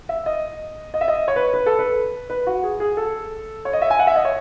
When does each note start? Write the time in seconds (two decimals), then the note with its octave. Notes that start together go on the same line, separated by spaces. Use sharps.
0.09 E5
0.26 D#5
0.94 D#5
1.01 E5
1.08 D#5
1.28 C#5
1.36 B4
1.53 B4
1.66 A4
1.79 B4
2.30 B4
2.47 F#4
2.63 G#4
2.80 G#4
2.97 A4
3.65 C#5
3.73 D#5
3.82 E5
3.90 G#5
3.99 F#5
4.07 E5
4.16 D#5
4.25 C#5